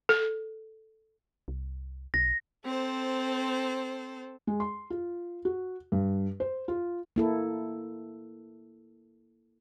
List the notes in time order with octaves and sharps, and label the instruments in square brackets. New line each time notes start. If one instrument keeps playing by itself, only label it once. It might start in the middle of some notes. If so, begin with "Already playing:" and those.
[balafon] A4
[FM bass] C2
[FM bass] B1 [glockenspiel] A#6
[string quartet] C4 A4 C5
[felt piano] G#3
C6
F4
F#4
G2
C5
F4
[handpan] A#3 E4 A4